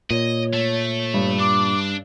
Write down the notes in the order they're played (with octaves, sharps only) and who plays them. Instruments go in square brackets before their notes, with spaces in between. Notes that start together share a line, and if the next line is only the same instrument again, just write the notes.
[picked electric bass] A#2 [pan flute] C#5 [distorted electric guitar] D#5
[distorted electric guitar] A3
[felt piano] G2
[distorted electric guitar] D4 [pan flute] D6